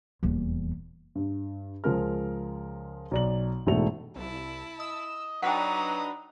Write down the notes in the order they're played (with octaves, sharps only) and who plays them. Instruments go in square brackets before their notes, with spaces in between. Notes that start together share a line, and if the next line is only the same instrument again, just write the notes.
[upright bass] D#1 E2
[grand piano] G2
C#2 F3 G#3 A#4 F6
B1 D5 F#7
E1 G#2 A3 E4 A4 F7
[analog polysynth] C2 [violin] E4 A5
[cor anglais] D#5 [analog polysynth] E6
[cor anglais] F#3 [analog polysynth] D4 F#4 B4 [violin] D#4 D#6 [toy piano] F#5 G5